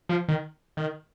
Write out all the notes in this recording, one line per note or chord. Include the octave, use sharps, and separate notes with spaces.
F3
D#3
D#3